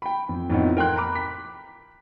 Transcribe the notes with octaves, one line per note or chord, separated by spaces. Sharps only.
G5 B5
F2
F2 A2 B3 D#4
A#4 G5 C6 F#6
A#5 B5 D6
B6